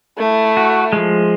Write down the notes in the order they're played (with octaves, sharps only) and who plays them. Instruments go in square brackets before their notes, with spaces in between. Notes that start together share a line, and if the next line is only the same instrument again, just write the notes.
[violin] A3 E4
[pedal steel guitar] F#4
F3 G#3